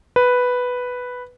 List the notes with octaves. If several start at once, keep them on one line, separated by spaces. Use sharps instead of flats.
B4